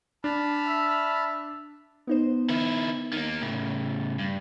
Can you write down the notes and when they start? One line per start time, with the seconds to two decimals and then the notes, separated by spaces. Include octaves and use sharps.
0.24 D4 A5 B5 F6
0.67 E5
2.07 B3 D#4 C5
2.49 D#3 E4
3.13 D#3 A#3
3.41 A2 C#3
4.19 G2